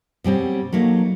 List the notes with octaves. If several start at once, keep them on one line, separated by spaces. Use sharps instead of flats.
B2 G3 C4 C#4
F#3 A3 A#3 D#4